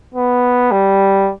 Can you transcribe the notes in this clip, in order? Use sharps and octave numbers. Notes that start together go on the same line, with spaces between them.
B3
G3